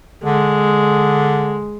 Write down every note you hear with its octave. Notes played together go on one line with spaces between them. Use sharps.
D3 G#3